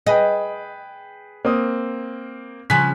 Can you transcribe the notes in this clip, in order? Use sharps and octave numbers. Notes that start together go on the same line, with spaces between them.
G#4 B4 D#5 G5
A#3 C4 D#6
C#3 F3 G#5 F#6 B6